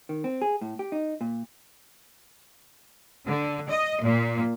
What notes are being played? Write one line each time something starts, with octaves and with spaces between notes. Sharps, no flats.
D#3
C4
G#4
A2
G4
D#4
A#2
D3
D#5
A#2